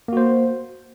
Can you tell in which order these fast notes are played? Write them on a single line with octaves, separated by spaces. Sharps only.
A#3 F#4 C5